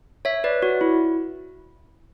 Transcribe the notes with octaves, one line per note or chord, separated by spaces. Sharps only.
C#5 E5
B4 D5
F#4
E4